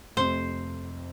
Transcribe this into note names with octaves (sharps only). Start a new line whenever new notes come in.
F2 C3 A3 C4 C5